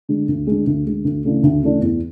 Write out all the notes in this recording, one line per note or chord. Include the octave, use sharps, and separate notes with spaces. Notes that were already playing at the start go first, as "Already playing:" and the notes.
D3 G#3
D2
D3 G#3
D2
D3 G#3
D2
C#3 E3 A3 D4
D2
C#3 E3 A3 D4
E2